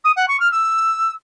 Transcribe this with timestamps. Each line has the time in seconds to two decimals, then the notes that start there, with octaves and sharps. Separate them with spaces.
0.04 D#6
0.16 F#5
0.28 C#6
0.40 F6
0.51 E6